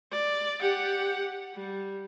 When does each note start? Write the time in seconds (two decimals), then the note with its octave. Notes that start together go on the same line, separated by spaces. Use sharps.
0.12 D5
0.61 G4 F#5
1.54 G3